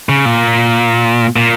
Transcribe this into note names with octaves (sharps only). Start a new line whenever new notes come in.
C#3
A#2
A#2